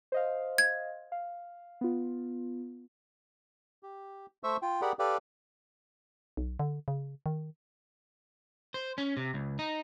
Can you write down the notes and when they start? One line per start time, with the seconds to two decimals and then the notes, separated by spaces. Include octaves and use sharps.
0.12 C5 D#5 F5
0.58 G#6
1.12 F5
1.81 B3 F4
3.83 G4
4.43 A3 C5 E5 C#6 E6
4.62 F4 G5
4.82 G4 G#4 A#4 D5 F#5 B5
4.99 G4 A4 B4 D5 F5 G5
6.37 B1
6.60 D3
6.88 C#3
7.26 D#3
8.74 C5
8.98 C#4
9.17 C3
9.34 C#2
9.59 D#4